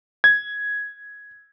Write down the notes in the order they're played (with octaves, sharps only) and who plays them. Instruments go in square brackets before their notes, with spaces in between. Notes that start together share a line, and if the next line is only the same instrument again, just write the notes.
[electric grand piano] G#6